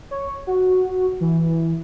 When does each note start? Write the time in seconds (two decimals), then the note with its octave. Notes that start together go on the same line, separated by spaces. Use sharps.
0.11 C#5
0.47 F#4
1.21 E3